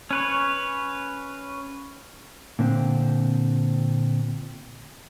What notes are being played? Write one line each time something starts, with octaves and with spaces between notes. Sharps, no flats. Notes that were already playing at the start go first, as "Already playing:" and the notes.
C#4 B4 C#5
A#2 D3 C4